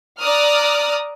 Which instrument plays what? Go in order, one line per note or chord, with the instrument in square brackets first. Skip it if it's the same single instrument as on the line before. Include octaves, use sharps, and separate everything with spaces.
[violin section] D5 A#5 D#6 F6 F#6